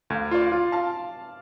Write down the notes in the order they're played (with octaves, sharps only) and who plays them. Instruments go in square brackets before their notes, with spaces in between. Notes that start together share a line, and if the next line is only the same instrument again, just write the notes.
[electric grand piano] D2 [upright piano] F5
[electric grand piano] F4 [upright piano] D5
[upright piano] F5
[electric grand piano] F4
[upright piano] F5 A5